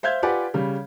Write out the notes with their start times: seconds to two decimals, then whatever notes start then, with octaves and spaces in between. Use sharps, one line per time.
0.03 C5 E5 F5 G6 G#6
0.23 F4 G4 B4 D5 F#5 G#5
0.54 C#3 G3